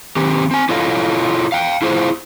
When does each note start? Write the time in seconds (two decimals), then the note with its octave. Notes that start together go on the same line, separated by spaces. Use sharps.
0.16 D#3 C4 G4
0.51 C4 G#5
0.69 E4 F4 A4 C#5 D#5 F5
1.52 F5 G5
1.82 E4 F4 G#4 C5